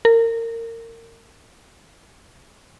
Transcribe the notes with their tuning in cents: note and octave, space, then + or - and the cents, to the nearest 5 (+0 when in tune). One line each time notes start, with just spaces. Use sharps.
A#4 -25